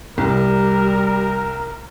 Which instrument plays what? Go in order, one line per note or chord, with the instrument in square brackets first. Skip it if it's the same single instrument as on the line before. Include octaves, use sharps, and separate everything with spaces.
[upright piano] C2 [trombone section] G3 [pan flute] G4 [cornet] A#4